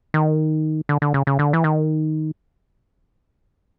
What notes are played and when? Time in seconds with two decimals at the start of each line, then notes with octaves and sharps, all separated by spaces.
0.14 D#3
0.89 D3
1.02 D3
1.14 C#3
1.27 C#3
1.39 D3
1.53 E3
1.64 D#3